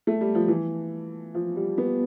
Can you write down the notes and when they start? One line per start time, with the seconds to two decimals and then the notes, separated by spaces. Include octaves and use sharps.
0.07 A3
0.21 G3
0.35 F3
0.48 E3
1.35 F3
1.56 G3
1.78 B3